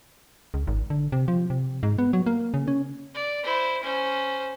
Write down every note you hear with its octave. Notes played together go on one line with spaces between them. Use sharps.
C#2
G#1
D3
C3
F3
C3
G#2
B3
F#3
A#3
C#3
C#4
D5
E4 C5
C#4 C5